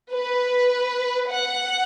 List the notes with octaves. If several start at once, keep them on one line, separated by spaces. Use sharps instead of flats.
B4
F#5